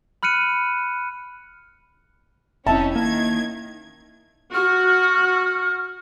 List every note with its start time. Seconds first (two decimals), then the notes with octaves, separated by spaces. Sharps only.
0.23 B5 F6 F#6 C#7 D#7
2.67 F1 C4 C#4 D#4 E4 E5 A5
2.96 D#3 A#3 G#6
4.54 F#4 F6